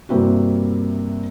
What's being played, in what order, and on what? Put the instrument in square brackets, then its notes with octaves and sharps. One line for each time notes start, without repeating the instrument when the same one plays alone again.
[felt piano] G2 C3 A#3 C4 E4 F#4